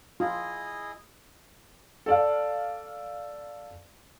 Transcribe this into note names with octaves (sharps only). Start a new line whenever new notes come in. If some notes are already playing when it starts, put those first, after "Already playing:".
E4 F4 G#4 D#5
A4 D5 F5